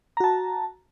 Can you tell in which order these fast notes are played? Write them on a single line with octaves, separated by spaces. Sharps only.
A#5 F#4 A5